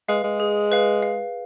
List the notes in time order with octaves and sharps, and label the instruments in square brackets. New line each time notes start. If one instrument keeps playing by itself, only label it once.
[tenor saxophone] G#3 [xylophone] B4 F5
[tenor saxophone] G#3
[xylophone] G#4
B4 F5
F5